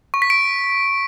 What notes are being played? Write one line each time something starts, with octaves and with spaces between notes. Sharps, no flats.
C#6
B6
D7